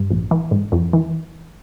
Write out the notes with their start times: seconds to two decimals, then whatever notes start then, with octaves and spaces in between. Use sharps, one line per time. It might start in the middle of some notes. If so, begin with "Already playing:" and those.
Already playing: G2
0.10 A#1
0.31 E3
0.51 G#2
0.72 F2
0.93 E3